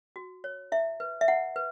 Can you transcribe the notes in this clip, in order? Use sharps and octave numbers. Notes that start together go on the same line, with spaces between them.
F#4
C#5
E4 E5
B4
E5
E4 F#5
B4